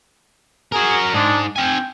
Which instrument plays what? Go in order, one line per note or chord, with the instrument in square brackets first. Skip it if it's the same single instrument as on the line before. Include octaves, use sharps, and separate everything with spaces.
[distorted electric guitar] F#4 A#4 [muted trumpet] G#4
[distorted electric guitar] G#2 G#4 [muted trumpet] D4
[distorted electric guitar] C4 G#5 [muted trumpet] G5